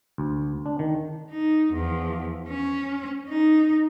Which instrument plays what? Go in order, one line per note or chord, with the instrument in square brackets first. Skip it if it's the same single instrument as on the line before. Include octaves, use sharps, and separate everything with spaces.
[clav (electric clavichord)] D2
D4
D#3
[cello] D#4
E2 F3
C#4
D#4